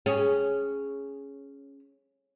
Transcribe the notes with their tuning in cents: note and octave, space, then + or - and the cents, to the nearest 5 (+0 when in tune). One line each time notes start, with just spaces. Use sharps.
C#4 +0 G#4 +0